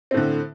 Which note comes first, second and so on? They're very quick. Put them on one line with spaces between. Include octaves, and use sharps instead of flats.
C4 A2 D3